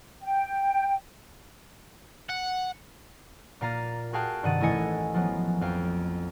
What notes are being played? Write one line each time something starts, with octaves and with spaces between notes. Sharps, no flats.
G5
F#5
A#2 A#3 F5 A#5 A6 D#7
F#4 G#4 F5 G5 A5 F#6
G2 C3 D#3 F#5 A6 D#7
A1 A3 E4 D#5 G#5 C#7
F3 F#3 B3
F2 F5 G5